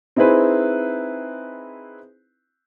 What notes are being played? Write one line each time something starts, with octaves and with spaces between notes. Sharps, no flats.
C4 D#4 E4 G#4 B4 C5